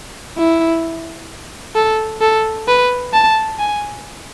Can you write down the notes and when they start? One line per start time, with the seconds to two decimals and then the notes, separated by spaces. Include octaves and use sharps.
0.38 E4
1.75 A4
2.21 A4
2.68 B4
3.13 A5
3.59 G#5